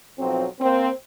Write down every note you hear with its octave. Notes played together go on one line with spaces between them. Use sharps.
B1 F3 F#3 C4
A#3 C4